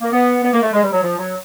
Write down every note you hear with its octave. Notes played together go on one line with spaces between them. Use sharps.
A#3
B3
B3
A#3
A3
G#3
G3
F#3
F3
F#3